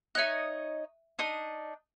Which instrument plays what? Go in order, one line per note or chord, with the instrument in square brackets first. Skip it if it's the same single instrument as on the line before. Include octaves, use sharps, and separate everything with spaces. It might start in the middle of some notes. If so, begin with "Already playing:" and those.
[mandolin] D#4 C#5 D#5 [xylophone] E5 F#6
[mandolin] D4 D#4 D#6